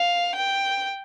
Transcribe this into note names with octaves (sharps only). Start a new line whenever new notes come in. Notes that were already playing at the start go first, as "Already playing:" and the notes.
Already playing: F5
G5